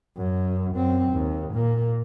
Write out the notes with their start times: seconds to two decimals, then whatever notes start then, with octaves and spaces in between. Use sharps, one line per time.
0.17 F#2
0.75 F#2 C4
1.13 D#2
1.54 A#2 A#3